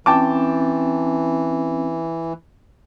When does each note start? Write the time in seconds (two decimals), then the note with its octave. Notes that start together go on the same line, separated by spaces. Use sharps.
0.06 E3 C4 C#4 G5 A5 D6